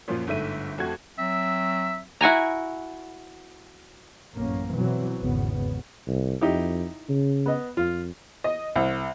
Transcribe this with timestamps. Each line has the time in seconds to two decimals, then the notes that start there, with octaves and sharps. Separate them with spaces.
0.08 F#2 A#2 F3
0.27 G1 G#2 A3 E5 D#7
0.78 F2 A3 F#4 G#6
1.18 F#3 C4 E5
2.21 E4 F#4 G#5 A#5
4.35 A1 F#2 A#3 C#4
4.74 B2 E3 F#3 C4
5.19 G#1 E2 C#3 B3
6.07 C2
6.41 F2 D#4 E4 G4
7.09 C#3
7.46 B3 D#5
7.77 F2 F4
8.44 D#5
8.76 C2